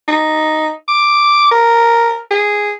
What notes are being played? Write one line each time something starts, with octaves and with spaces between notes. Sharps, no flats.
D#4
D6
A#4
G#4